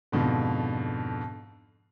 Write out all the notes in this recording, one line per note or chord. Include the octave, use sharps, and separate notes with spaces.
F2 G#2 B2 D3